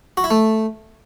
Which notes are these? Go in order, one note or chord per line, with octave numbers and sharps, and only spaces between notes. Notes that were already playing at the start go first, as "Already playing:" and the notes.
F#4
E4
A3